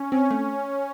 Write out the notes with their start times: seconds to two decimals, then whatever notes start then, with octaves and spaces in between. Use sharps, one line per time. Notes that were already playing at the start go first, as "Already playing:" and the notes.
Already playing: C#4
0.12 C4 C#4
0.31 A3